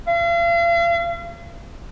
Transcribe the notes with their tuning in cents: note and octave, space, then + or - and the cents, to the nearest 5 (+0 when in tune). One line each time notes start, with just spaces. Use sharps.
F5 -40